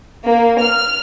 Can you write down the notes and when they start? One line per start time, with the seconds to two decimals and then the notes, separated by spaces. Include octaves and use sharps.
0.23 A#3
0.60 F6